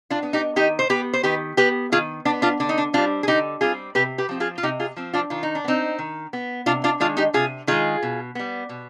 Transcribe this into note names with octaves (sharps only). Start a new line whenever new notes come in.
D4 F4
B3
D#4 G4
D#3 D#4 G4
C5
B3 G4 B4
C5
D#3 G4 B4
B3 G4 B4
D#3 F4 G#4
B3 D4
D4 F4
D3 D4
D#4
D4
G3 C4 D4 F4
G#4
D3 D#4 G4
G3 C4 F4 G#4
C3 G4 B4
G4 B4
F3 C4
F4 G#4
F4
C3 D#4 G4
F4 G#4
F3 C4
D4 F4
D#3 F4
D#4
D4
B3
C4 D#4
D#3
B3
C3 D4 F4
D4 F4
D#3 G#3 D4 F4
D#4 G4
C3 F4 G#4
D#3 G#3 F4 G#4
B2
G3 B3
B2